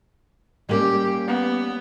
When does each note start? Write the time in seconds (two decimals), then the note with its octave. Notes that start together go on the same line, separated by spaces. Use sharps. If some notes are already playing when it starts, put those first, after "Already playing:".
0.69 G3 A#3 C#4 G4
1.27 B3